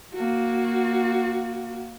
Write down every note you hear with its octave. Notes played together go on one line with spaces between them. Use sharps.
A#3 F#4